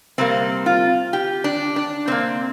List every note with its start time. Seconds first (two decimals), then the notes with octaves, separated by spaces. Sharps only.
0.18 C3 G3 A#3 C4
0.66 F4
1.13 G4
1.44 D4
1.76 D4
2.08 C3 A#3 C4